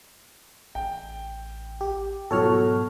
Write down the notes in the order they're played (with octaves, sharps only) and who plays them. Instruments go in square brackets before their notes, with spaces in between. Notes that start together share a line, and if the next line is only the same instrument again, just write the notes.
[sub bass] A1 [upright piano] G5
[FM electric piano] G4
[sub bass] G#2 [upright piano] B2 F#3 [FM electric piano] A4 C#5 F6